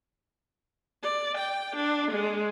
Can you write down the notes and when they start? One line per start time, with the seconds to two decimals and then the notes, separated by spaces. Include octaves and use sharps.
1.03 D5
1.37 G5
1.76 D4
2.11 G#3